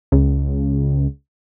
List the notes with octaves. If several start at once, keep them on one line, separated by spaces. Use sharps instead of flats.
C#2